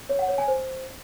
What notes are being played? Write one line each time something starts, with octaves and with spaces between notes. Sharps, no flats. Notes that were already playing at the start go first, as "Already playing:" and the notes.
C#5
F#5
C#5
G#5
C5